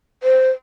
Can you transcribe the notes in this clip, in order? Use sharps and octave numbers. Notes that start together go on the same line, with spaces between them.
C5